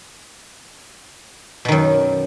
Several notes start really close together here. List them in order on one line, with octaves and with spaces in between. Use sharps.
B2 D#3 F#2